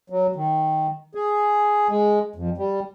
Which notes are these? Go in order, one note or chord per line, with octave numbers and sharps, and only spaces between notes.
F#3
D#3
G#4
G#3
F2
G3